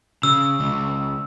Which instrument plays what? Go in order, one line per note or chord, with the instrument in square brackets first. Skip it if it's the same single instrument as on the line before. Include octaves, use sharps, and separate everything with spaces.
[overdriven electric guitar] C#3 [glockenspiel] E6
[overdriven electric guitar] C#2